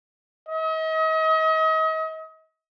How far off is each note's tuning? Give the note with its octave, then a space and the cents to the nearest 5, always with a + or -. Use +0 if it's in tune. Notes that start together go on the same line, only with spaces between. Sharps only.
D#5 +40